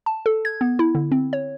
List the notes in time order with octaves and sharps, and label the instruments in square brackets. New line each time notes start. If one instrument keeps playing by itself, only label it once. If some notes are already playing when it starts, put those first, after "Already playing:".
[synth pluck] A5
A4
G#6
B3
E4
D3
C4
C#5